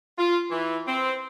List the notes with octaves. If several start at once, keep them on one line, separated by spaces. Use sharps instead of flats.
F4
E3
C4